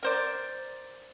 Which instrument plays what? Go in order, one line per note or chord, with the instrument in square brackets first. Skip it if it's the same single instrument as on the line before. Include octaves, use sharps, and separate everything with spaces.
[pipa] A#4 C5 D5